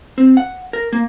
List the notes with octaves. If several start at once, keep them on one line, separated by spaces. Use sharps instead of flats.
C4
F#5
A#4
A#3